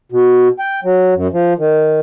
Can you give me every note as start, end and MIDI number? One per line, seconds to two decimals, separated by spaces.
0.12 0.48 47
0.59 0.80 79
0.84 1.14 54
1.15 1.28 42
1.33 1.53 53
1.59 2.00 51